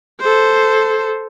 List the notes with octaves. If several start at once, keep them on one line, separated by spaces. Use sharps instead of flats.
A4 C5